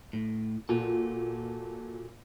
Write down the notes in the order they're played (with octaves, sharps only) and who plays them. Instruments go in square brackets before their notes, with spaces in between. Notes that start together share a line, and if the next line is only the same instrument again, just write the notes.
[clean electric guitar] A2
[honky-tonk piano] A#2 [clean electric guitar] F4 F#4 A4